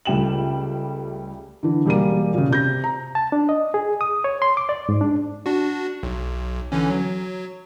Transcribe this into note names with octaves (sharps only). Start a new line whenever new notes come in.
C#2 G3 A3 G5 E7 F#7
D3 E3
E1 G3 A#3 D#7
A#2 C#3
C3 G6 A#6
A#5
A5
D4
D#5
G#4
D#6
C#5
C6
D6
D5
G#2
D4
D4 F#4
B1
D3 E3 C#4
F#3